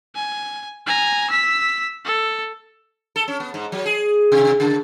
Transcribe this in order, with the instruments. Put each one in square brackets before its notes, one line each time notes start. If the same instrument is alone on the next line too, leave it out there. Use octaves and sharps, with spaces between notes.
[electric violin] G#5
G#5 A#5
E6 B6
A4
[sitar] A4
C#4
B3
G#2
F#3
G#4
C3
C#3